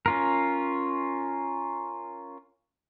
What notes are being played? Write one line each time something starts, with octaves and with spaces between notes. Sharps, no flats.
C#4 F4 A#4